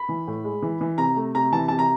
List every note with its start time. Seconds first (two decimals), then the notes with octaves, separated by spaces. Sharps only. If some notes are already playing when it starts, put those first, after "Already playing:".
Already playing: B5
0.09 E3
0.27 A2
0.44 G#3
0.63 E3
0.81 E3
0.98 C3 A#5
1.16 A3
1.35 C3 A#5
1.52 E3 A5
1.68 C3 A5
1.79 A#5